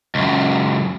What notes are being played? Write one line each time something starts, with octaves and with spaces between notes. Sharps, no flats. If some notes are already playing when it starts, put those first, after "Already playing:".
C#2 F#2